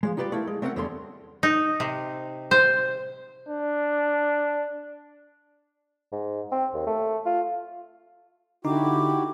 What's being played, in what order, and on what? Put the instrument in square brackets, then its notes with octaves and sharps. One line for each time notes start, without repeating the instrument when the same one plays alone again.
[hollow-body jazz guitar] F3 F#3 G#3
D#4 F4 G4 B4 C5 D5
A3 A#3 E4
G#3
A3 C4 C#4 A#4 F5 F#5
E2 D3 G3 A4 C#5 C6
[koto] D#4
C3
C5
[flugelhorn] D4
[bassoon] G#2
C4
D#2
A3
F4
[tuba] D3 [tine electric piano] D#4 [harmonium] E4 F#4 G4 [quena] D6